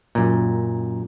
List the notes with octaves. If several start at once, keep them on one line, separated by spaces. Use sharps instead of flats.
F#2 A#2